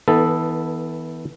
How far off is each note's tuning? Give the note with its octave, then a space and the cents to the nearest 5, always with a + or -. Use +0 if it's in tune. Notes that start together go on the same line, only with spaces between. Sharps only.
E3 -30 B3 +0 A4 +0